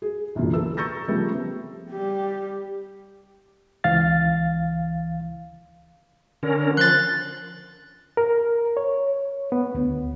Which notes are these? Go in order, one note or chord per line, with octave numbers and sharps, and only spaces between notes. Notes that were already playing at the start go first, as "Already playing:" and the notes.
G#4
C2 F#2 A#2 D3 E3
A4 B4 E6
A#5 C#6 E6 G6 A6 A#6
C#3 F3 G3 A3 B3 C4
G3 G4
C#2 E3 F5 A6
D3 C#4 A#4
F3 C6 F#6 A6
A#4
C#5
B3
D2